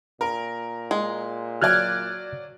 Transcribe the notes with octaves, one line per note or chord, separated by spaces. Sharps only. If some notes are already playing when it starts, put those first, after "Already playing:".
A#2 A#4
G#3
F#3 D5 F6 F#6 G#6